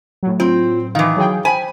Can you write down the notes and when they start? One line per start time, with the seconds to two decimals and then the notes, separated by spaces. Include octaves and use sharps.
0.23 A2 F#3
0.40 C4 F4
0.95 D#3 E3 F5
1.17 F#3 G#4 G5
1.45 C5 G5 G#5 B5